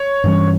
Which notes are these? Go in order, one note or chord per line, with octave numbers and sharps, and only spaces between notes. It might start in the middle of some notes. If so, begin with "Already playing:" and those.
Already playing: C#5
G2 E3 G3 C#4